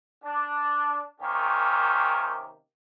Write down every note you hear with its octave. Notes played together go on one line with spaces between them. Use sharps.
D4
C3 D#3 A#3 C#4 G4